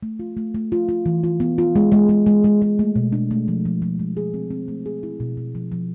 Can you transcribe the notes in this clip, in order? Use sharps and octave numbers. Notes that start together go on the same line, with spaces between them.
A3
F4
A3
A3
F4
F4
E3
F4
B3
F4
G#3
G#3
G#3
G#3
G#3
G#3
A3
B2
D4
A3
F3
F3
F3
G#3
G#4
C4
C4
A3
G#4
E4
B2
B2
F3
F3